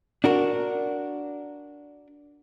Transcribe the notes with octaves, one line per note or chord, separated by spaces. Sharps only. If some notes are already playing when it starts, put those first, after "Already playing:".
D4 F#4 A#4